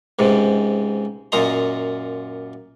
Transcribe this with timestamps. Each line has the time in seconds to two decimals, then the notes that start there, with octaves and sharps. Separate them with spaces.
0.19 C#2 G#2 C3
1.32 F#2 A#2 F4 D#5 A#5